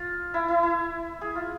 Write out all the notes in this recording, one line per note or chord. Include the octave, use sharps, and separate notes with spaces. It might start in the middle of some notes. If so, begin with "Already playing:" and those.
Already playing: F4
E4
E4
E4
G#4
F4